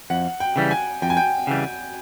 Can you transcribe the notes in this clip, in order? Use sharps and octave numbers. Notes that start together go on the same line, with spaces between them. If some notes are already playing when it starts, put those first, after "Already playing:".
F2 F#5
G5
C#3 E3 G3
G#5
F2 G5
G#5
G5
C#3 E3 G3